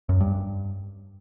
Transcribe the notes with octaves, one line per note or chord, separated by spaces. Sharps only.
F#2
G2